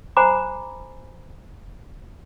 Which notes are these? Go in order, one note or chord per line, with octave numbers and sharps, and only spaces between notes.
C5 F#5 G#5 A#5 B5 D6